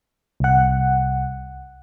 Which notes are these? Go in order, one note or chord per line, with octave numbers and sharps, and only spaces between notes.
C2 F#5